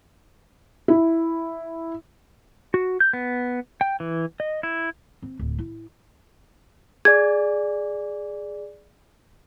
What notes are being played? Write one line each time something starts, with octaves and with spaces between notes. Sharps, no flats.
E4
F#4
G6
B3
G5
E3
D#5
E4
C4
D1
E4
G#4 D5 G#6